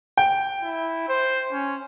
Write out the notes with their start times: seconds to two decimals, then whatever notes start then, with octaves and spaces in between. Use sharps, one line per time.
0.17 G5
0.63 E4
1.08 C5
1.52 C#4